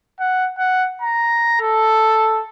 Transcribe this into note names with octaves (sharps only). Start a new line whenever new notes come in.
F#5
F#5
A#5
A4